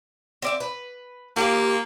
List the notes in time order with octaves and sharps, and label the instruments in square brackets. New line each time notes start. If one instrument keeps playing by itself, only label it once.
[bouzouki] C4 D5 E5
B4
[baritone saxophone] A#3 [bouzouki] F4 G4 C5